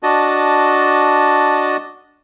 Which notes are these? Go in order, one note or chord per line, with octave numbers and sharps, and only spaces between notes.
D4 F#4 D#5 A5